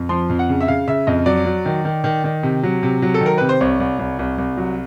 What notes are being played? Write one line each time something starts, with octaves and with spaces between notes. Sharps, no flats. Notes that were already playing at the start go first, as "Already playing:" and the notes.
Already playing: F2
F3 C6
F2
F#5
C#3
E5
C#3 F5
C#3 E5
F2 D#5
F#3 D5
F#3
D#3
D#3
D#3
D#3
C3
F#3
C3
F#3
A4
D#3
A#4
C3 B4
C5
C2 C#5
C2
C2
C2
C2
F#3